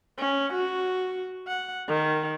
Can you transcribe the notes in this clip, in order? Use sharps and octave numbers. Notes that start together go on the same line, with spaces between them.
C#4
F#4
F#5
D#3